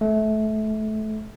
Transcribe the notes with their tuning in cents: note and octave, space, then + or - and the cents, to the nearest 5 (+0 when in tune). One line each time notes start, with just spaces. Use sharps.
A3 -25